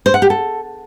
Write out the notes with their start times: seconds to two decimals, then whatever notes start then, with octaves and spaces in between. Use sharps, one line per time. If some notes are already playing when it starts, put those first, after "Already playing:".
0.06 C5
0.14 F#5
0.22 G4
0.30 A4